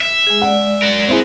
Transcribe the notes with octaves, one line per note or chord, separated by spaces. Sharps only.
E5
G#3 G#4
G#3 D5 F#5
F#4 A#4
C4 E4 G#4